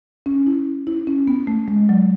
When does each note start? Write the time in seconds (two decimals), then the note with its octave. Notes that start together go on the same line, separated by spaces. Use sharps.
0.26 C#4
0.46 E4
0.87 E4
1.07 C#4
1.27 B3
1.47 A3
1.68 G#3
1.89 F#3